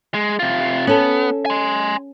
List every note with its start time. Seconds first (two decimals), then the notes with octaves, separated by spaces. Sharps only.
0.14 G#3
0.39 C3 F4
0.87 B3 C#4 A4
1.46 G#5 C6